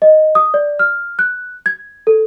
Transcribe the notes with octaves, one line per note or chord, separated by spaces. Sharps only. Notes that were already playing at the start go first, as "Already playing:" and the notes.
D#5
D#6
D5
F6
F#6
G#6
A4